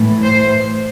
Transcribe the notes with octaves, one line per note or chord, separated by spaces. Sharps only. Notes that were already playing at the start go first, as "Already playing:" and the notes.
Already playing: A2 E3 A3
C5